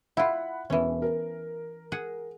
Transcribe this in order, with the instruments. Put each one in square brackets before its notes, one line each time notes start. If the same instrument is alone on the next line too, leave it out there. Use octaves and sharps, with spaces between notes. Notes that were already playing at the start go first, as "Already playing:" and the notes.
[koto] E4 F4 [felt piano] F#5 B5
[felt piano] E1 [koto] E3 C#4
[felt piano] A#4
[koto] G#4 F#5